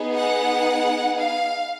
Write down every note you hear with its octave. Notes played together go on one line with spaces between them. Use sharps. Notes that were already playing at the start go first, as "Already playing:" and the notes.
Already playing: B3 D#4 G#4
F#5
F5